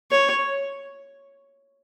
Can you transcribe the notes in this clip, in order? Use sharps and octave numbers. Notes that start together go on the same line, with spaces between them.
C#5